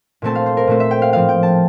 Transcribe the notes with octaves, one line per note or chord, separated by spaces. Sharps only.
A#2 A3 C4 A5
F5
C5
A#4
A#2 A3 C4 C5
E5
G5
F5
A2 F3 C4 F5
G5
A5